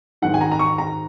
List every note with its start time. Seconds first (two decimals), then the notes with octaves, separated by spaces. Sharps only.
0.22 G#2 D#3 F#5
0.34 G#5
0.41 A#5
0.52 A#5
0.59 C#6
0.78 A#5